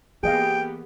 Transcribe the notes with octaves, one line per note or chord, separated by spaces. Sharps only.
E3 A#3 B3 G4 G#4 D#5 F5 G5